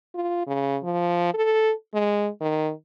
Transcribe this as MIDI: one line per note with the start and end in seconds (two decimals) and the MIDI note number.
0.15 0.46 65
0.47 0.78 49
0.84 1.32 53
1.34 1.72 69
1.94 2.29 56
2.41 2.72 51